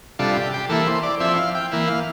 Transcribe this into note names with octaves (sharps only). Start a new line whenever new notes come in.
C3 G3 D4 F4 A4
G4
G4
E3 A#3 E4 A4
C5
D5
F3 C4 E4 E5
F5
G5
E3 A#3 E4
F5